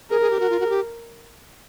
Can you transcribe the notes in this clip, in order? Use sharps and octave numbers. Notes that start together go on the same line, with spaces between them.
G#4 A#4
G#4
G4
F#4 A#4
F4
F#4
G#4
G4